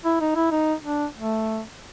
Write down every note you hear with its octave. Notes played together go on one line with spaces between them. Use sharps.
E4
D#4
E4
D#4
D4
A3